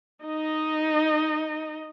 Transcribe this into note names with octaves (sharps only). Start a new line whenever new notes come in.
D#4 D#5